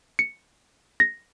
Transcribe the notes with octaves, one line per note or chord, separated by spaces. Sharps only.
C#7
A#6